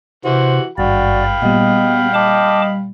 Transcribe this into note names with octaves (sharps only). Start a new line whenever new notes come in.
C3 E3 F#4 C5
G#1 G2 F#4 D5 F5 G5 B5
A#2 G3 B3 D#5
D#5 A5 D6